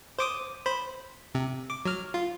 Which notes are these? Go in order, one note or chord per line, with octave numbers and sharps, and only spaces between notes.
C5 D6 D#6
C5 B5
C3
D6
F#3 F6
F4